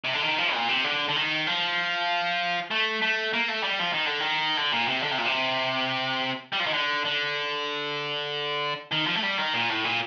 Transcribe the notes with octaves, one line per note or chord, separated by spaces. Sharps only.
C3
D3
D#3
F3
A#2
C3
D3
D3
D#3
F3
A3
A3
A#3
A3
G3
F3
D#3
D3
D#3
D3
A#2
C3
D3
C3
A#2
C3
G3
F3
D#3
D3
D3
D#3
F3
A3
G3
D#3
A#2
A2
A#2